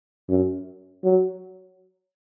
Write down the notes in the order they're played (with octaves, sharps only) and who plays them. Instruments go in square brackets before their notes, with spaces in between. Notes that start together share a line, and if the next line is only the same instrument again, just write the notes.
[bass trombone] F#2
F#3